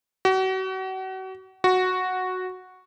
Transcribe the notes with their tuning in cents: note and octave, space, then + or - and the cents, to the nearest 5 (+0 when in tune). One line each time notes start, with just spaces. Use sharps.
F#4 +35
F#4 -5